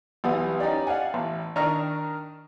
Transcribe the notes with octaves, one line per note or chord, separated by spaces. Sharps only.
B1 E3 G3 B3 D#6
C#4 D#4 G4 D5
D5 F5 F#5 G#5
A1
D#3 D4 A#5 C#6 F6